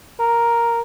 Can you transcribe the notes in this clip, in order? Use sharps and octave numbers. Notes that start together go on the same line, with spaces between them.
A#4